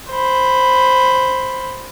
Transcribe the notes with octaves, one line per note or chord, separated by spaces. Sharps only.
C5 B5